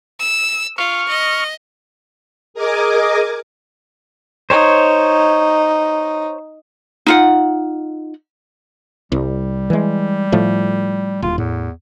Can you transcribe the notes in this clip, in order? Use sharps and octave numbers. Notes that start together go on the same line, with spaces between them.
E6
F4 C#6 F6
D#5
G#4 A#4 D#5 G#5 D6
D#4 C5 C#5
D#4 F4 F#5
C2 G3
E3 G#3
A2 F3 A3
D#1 F4
E2 A2